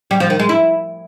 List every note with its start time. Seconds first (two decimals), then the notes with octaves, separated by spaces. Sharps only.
0.11 G3
0.20 F3
0.30 D#3
0.40 G#3
0.49 E4